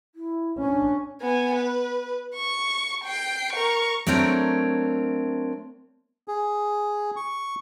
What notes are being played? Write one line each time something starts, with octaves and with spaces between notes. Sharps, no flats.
E4
C#4 D4
B3 G#5
B4
C#6
G5 C7
A#4 C#6
F#3 A3 C4 D4 A#4 C#5
G#4
C#6